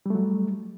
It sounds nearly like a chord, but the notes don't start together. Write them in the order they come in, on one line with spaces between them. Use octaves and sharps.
G3 A3 F#3